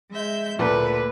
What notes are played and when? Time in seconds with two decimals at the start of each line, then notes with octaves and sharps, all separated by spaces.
0.10 G#3 E5 G6
0.59 D2 A#2 A4 B4